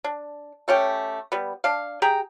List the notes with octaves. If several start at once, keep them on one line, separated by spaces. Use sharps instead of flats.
D4
A3 C#4 G4 G5
G3 B3
D4 F5
G4 G#4 G5 A#5